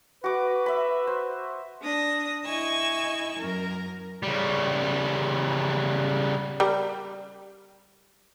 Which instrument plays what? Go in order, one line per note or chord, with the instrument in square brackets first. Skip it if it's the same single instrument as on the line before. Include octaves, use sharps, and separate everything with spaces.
[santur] F#4 D6 [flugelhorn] B4
[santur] E5 B5
C5
[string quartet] D4 D#6 A#6
E4 D#5 G#5 C#6 E6
F#2 A#4
[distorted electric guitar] C#3 G3
[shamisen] G3 A#4